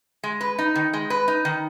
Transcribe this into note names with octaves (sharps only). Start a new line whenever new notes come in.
G#3
B4
D#4
D#3
G#3
B4
D#4
D#3